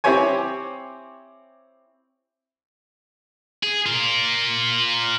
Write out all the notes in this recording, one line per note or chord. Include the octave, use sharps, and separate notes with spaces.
C4 E4 G4 C5 C#5 G#5
G#4
F4 A#4